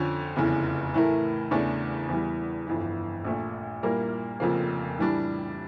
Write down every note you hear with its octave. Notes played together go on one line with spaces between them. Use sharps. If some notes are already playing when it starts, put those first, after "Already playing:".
Already playing: F2 D3 F3 C#4
F1 E2 C#3 E3
A2 E3 A3 E4 A#4
E2 C#3 E3 A3 D4
E2 E3 G3
G1 F2 E3
A#1 A#2 A3
A#2 G3 A#3 E4 A#4
F1 F2 C#3 F3 A#3
A2 E3 G3 D4